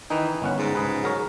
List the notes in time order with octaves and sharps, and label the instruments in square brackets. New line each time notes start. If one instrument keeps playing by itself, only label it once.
[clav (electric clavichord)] D#3 D#4 [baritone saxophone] E3
[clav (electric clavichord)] G1 C#4 F#5
[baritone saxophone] G#2
[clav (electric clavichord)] C#2 G#4 B4
F#3 A#4 C#5